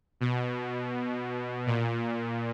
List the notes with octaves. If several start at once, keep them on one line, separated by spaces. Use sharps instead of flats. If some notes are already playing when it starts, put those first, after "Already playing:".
B2
A#2